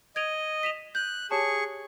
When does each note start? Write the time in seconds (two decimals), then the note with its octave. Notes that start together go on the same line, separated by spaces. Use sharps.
0.16 D#5 G#6 D7 F7
0.63 B6 E7 F7
0.95 F#6 G6
1.31 G4 G#4 C#5 A5 C#6